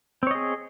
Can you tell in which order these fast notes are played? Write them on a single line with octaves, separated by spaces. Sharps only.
C4 C#5 D#5 G#4